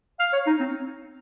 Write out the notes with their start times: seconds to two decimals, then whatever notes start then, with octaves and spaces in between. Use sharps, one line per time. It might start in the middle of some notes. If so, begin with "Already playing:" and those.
0.20 F5
0.33 C#5
0.47 D#4
0.60 C4